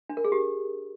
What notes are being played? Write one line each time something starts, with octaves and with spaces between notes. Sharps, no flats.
D4
A#4
G#4
G4